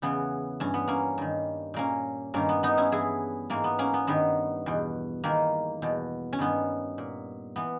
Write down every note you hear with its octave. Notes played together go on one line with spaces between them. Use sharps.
E2 C#3 E3 B3
G2 E3 C#4
B3
A#3 C#4
G2 D#3
A#2 A#3 C#4
G2 D#3 A#3 C#4
B3
B3 D#4
C#4 E4
G2 E3 E4 G#4
G#2 E3 A#3
B3
A#3 C#4
B3
G2 D#3 B3
E2 B2
E2 D#3 A#3
E2 B2
C#4
G2 D#3 B3
A#2
E3 B3